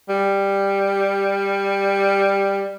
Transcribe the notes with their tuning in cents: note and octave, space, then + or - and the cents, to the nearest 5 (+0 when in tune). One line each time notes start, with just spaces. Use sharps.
G3 +10